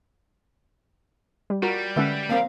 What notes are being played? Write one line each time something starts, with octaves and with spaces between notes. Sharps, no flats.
G3
G3 F4 F#4 A#4
D3 G#3 C#4 B4 E5 F#5
A#3 C4 A#4 F5